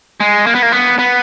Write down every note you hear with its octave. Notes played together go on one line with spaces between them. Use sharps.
G#3
A#3
B3
A#3
B3
B3